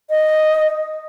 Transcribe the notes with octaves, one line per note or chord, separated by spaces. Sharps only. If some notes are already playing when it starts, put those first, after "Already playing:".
D#5